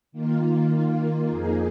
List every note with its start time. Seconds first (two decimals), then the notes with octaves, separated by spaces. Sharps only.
0.12 D#3 A#3 F4
1.29 F2 F3 A#3 D#4 G#4